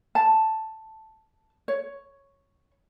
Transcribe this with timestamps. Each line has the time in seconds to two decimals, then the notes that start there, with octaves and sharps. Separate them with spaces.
0.15 A5
1.68 C#5